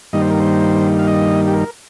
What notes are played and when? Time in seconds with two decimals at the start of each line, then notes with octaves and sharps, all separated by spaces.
0.13 G2 D#3 G3 A#3 D#4 D#5
0.22 C5
0.31 A#4
0.40 C5
0.99 F5
1.08 D#5
1.47 G4
1.54 A#4